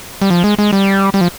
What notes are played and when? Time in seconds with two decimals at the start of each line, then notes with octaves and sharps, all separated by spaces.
0.22 G3
0.30 F3
0.44 G#3
0.58 G#3
0.73 G3
1.14 G3
1.21 F3